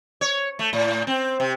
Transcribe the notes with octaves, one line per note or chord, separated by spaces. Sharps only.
C#5
A3
A2
C4
C3